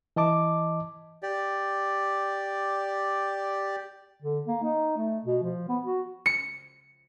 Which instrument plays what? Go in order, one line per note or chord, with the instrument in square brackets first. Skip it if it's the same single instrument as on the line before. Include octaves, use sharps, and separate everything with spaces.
[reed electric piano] E3 D#5 A5 D6
[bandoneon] G4 D5
[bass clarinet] D3
A#3
D#4
A3
B2
F3
B3
F#4
[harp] C#7